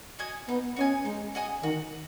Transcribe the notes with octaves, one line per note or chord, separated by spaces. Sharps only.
F#4 D#5 G#5
B3 D#4
C#4 F#4 D#5 G#5
G#3 D#4
F#4 D#5 G#5
D#3 F#4